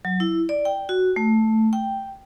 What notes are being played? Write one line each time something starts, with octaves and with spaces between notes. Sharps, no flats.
F#3
E4
D5
G5
F#4
A3
G5